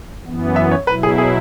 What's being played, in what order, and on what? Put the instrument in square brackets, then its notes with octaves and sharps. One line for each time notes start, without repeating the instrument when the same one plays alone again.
[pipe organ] F#2 E3 B3
[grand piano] E5
C#5
[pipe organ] B2 F#3 E4 [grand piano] B4
[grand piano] G#4
G#4